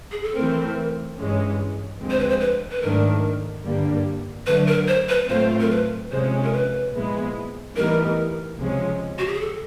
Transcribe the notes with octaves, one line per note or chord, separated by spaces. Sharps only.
G#4
A4
E3 A3 C4 A#4
G2 E3 G#3 C#4
D2 D3 F3 G#3 C4
C5
B4
C5
B4
B4
G#2 D#3 F#3 A3 D4 A#4
G2 D3 G3 A#3
D3 F#3 A3 B4
A#4
C5
B4
A2 F#3 A3 C4 F4 C5
A#4
B4
C3 F3 G#3 C#4 C5
A#4
B4
A#2 F3 G#3 B3 E4
A2 E3 G3 B3 D#4 A#4
C#2 C3 F3 G#3 C#4
F#4
G4
G#4
A4